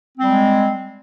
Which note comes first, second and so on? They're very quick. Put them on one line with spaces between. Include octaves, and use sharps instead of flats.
C4 G3 G#3